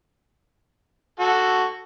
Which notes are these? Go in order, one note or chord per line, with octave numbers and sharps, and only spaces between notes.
F#4 A4